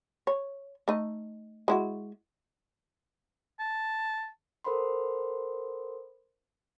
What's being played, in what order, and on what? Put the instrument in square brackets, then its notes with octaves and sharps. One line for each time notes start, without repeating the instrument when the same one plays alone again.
[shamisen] C#5
A3 D#4 D#5
G#3 E4 F#4
[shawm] A5
[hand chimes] A4 A#4 C5 F#5 B5 C6